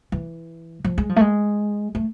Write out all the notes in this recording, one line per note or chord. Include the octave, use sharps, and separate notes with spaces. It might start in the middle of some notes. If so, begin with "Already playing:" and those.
E3
F3
G#3
F3
A3
G#3
A3